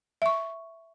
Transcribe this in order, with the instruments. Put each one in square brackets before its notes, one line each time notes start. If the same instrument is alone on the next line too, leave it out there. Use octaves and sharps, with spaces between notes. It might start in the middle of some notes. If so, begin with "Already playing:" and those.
[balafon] E5 C#6